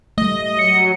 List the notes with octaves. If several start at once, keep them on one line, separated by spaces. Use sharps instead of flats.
G3 A3 D#5
F#3 C#7